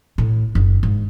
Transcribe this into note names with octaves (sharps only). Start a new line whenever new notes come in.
A2
F#1
G#2